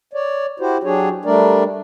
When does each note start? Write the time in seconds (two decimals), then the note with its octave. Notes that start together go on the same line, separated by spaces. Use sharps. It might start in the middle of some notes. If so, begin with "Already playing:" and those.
0.13 C#5 D5
0.60 E4 F#4 G4 C5
0.84 F#3 D4 G4 G#4 C#5
1.25 G3 A3 D4 A#4 D5